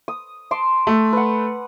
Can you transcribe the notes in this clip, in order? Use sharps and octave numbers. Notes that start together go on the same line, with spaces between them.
D#6
A5 C6 D6
A3
B4 F#5